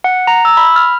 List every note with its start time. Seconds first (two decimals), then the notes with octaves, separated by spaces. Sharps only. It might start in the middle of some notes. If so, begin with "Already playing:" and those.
0.04 F#5
0.27 A#5
0.45 E6
0.57 B5
0.76 F6